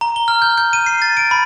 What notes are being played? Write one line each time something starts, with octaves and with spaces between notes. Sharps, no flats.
A#5
G7
F6
G6
G6
D#7
C7
A6
D7
B5